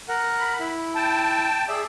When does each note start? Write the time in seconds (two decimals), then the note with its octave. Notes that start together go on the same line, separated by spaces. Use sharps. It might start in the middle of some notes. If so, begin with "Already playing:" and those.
0.08 A#4 F#5
0.39 B5
0.60 E4
0.95 G5 A5
1.68 G#4 D5 E5